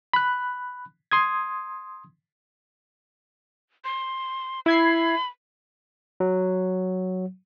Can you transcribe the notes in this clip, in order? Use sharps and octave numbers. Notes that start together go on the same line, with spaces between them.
B5 F#6
C6 D#6 G#6
C6
E4 B5 G#6 C7
F#3